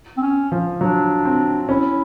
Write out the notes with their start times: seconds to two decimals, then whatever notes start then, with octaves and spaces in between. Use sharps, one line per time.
0.17 C4
0.23 C#4
0.52 F3
0.81 F#3 D4
1.25 C4
1.69 C#4 E4